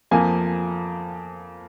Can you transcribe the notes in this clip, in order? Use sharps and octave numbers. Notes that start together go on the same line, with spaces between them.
F2 F3 A#3 G#5